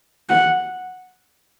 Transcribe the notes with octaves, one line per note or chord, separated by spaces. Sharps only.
F#5